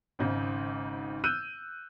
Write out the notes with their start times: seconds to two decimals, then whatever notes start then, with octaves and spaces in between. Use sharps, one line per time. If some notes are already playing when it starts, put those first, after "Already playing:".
0.19 G#1 G#2 C#3
1.24 E6 F#6 G6 D#7